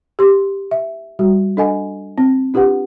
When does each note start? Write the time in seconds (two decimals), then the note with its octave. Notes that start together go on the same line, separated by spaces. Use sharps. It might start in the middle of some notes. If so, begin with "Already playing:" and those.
0.19 G4 C6
0.71 E5
1.19 G3 F#4
1.57 D4 A4 D#5 F#5 G#5
2.18 C4
2.54 D4 F4 G4 B4 F#5